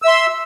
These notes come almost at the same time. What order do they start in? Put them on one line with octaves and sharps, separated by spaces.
E6 E5 C6